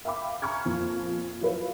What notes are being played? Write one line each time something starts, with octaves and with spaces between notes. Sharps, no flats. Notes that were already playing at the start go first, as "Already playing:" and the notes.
E5 F5 G5 B5 D6
G#5 A#5 B5 C#6 F6 G#6
F2 A#2
F3 F#3 E4 B4 C#5 F5